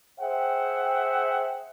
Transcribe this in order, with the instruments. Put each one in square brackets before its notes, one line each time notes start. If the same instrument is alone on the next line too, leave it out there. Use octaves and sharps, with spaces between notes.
[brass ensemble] G#4 C5 E5 F#5 G5